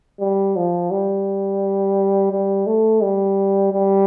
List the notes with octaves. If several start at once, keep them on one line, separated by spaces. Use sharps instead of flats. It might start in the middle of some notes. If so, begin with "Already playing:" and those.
G3
F3
G3
G3
A3
G3
G3